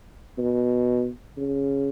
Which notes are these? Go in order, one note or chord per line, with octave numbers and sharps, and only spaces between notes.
B2
C#3